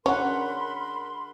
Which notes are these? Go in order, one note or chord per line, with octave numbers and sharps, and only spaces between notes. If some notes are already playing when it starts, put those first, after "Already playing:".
C#4 D4 G#4 A#4 F#5 B5 C6